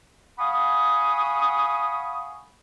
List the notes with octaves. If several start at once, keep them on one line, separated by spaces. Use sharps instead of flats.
F5 F#5 G#5 B5 C#6 D#6